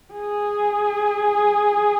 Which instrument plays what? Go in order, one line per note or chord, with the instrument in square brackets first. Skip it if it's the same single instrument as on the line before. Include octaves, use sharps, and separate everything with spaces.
[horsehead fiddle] G#4